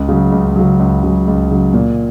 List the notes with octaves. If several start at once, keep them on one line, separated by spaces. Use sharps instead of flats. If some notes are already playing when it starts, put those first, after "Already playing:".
Already playing: C#2
C#3 F#3
C#2
C#3 F#3
C#2
C#3 F#3
C#2
C#3 F#3
A#2